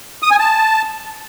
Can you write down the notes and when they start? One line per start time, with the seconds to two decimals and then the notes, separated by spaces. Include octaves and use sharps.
0.23 D#6
0.31 G#5
0.39 A5